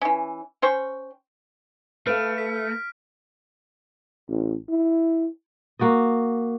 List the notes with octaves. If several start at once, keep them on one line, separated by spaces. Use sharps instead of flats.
E3 C#4
C#4 C5 G5 C#6
A3 A4 B4 F5 F6 D7
A4 B6
A1
E4
A#3 F#4 D5 D#5